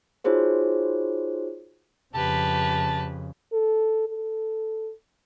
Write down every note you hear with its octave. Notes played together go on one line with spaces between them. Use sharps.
D#4 F4 F#4 G#4 C5 C#5
F2 C#3 G4 B4 A5
A4
A4